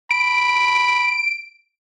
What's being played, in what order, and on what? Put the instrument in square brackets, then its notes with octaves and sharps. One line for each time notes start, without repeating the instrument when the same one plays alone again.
[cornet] B5 [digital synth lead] D7